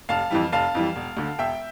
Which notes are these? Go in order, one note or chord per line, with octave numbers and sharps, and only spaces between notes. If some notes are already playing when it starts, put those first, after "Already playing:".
F1 F5 A5
F2 E3 G3
F1 F5 A5
F2 E3 G3
E1
D2 D3
E1 E5 G5